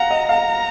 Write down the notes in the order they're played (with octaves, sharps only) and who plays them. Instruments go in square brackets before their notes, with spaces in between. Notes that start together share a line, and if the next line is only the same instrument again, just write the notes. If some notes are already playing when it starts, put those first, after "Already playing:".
Already playing: [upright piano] F5 F#5 [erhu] A#5
[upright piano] D#5
[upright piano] F5 [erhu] A#5